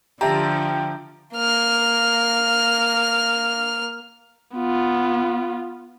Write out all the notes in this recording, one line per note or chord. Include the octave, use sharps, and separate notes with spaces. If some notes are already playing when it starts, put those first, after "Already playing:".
D3 F3 G4 E5 A5 A#5
A#3 F6
B3 F4